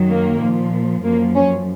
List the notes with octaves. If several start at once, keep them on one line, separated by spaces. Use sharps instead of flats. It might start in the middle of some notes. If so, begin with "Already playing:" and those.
Already playing: F#2 D#3 F#3
A#3
A#2 F3
F#2 F3 A#3
C#4